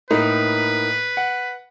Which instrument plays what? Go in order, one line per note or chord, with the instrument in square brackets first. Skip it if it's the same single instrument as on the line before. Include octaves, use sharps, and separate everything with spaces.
[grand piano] A2 A#3 D#4 [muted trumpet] B4
[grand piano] F#5